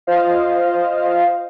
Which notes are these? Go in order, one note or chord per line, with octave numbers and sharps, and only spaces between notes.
F4 C5 D#5 F5